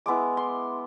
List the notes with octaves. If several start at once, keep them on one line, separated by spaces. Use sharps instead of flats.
G#3 B3 E4 D6
C6